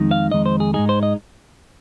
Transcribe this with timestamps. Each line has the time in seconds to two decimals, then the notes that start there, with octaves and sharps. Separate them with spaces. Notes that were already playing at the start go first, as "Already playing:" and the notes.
Already playing: F2 D#3 G#3 D#4
0.11 F5
0.32 F2 D#3 G#3 D#4 D#5
0.46 C5
0.60 G#4
0.74 G#2 G#3 D#4 G#4
0.89 C5
1.03 D#5